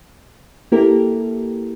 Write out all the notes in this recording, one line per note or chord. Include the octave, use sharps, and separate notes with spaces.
A#3 E4 G4 A4 A#4